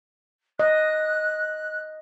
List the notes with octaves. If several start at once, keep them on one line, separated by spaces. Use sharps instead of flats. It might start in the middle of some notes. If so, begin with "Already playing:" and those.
D#5 F#6